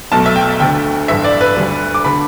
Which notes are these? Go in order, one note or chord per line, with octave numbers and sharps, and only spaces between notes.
B1 B2 A3 A5
E5
G5
D2 D3 A3 G5
A1 G2 D3 E5
D5
B4
D2 D3 G3
D6
D3 A3 B5